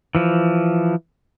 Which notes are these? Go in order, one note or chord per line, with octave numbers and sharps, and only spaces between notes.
E3 F3